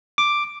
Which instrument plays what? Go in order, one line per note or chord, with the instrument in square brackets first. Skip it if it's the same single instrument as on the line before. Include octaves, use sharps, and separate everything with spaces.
[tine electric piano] D6